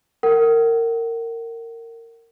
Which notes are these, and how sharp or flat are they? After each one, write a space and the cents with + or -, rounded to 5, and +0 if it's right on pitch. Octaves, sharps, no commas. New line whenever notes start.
A#4 -20 F#5 +40